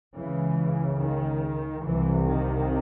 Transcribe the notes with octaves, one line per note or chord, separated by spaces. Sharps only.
C#3 E3
C#2
D#3
C2 C3 E3
D#3